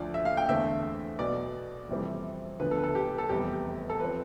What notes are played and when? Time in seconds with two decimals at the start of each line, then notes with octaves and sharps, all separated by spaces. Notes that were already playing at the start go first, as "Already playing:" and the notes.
Already playing: D2 D3 F3 D5
0.14 E5
0.25 F5
0.37 G5
0.49 E2 D3 A3 C4 E5
1.19 B1 B2 B3 D5
1.89 F2 C3 E3 G3 C4
2.59 D2 D3 F3 B3 B4
2.71 A4
2.78 B4
2.83 A4
2.95 G4
3.18 A4
3.29 F1 E2 C3 G3 B3 G4
3.53 G4
3.90 A4
4.00 F3 C4 B4